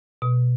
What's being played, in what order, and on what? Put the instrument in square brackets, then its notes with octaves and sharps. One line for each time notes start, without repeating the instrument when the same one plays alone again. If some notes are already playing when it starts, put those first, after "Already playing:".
[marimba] B2